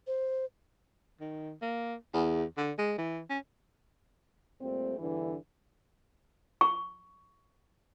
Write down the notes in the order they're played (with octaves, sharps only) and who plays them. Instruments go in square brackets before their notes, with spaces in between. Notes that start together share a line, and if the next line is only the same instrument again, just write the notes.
[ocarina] C5
[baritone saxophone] D#3
A#3
E2
D3
G#3
E3
C#4
[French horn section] A#2 G3 A3 C4
E2 G2 D3 E3
[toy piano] C#6